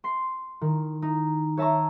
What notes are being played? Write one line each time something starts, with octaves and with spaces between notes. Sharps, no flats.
C6 C7
D#3
D#4
C#5 E5 A5 A#5 C#6